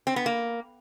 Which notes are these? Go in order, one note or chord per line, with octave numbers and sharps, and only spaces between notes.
C4
B3
A#3